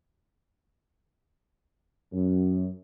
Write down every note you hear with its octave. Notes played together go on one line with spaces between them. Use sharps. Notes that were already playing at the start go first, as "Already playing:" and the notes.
F#2